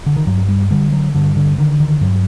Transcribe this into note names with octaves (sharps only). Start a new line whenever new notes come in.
D3
D#3
G2 F#3
G3
D3 G3
F#3
G2 D3
D3
D3 D#3
D#3
G2 F#3